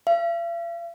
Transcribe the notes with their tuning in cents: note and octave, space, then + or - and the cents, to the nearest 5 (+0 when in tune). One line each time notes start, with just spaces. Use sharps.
F5 -45